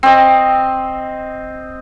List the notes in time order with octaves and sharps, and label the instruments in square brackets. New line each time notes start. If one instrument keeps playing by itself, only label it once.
[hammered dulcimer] C4 D#5